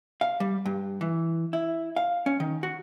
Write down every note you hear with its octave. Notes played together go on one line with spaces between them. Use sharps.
F5
G3
G2
E3
E4
F5
C#4
D#3
F#4